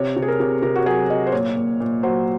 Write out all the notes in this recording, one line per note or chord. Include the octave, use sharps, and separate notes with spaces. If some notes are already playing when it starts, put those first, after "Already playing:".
Already playing: C3 C#5
C3
G#4
A#4
C3
C3 A#4
F#4
F#3 G#4
F#3 D#5
C5
A#2 C#5
A#2
A#2
F#3 C5